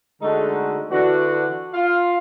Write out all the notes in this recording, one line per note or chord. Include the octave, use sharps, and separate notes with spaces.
D3 G#3 A3 D#4 F#4 A4
D3 E3 D4 F#4
F4 F5